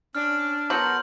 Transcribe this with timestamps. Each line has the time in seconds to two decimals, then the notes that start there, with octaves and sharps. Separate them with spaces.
0.15 C#4 D4 F6
0.70 F#3 B3 A4 A#4 C6 G6 F#7